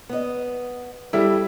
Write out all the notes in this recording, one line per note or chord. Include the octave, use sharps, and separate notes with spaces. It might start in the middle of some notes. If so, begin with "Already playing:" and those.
B3 D#5
G3 E4 A4